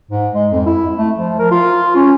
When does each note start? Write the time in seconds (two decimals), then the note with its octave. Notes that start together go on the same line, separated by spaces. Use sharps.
0.11 G#2
0.34 G#3
0.52 F2
0.66 E4
0.97 A3
1.18 F3
1.39 A#4
1.51 F4
1.96 C#4